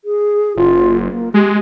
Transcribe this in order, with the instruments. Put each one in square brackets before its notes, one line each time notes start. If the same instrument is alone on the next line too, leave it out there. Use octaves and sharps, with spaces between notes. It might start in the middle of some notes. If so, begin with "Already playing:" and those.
[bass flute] G#4
[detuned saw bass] F#1 [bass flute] F4
[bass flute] A#3
[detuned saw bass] G#3 [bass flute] G4